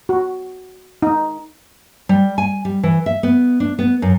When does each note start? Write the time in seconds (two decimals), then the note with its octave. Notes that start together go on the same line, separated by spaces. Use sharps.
0.09 F#4
1.02 D#4
2.09 G3
2.38 G#5
2.65 G3
2.83 E3
3.06 E5
3.23 B3
3.60 D4
3.79 B3
4.02 F#2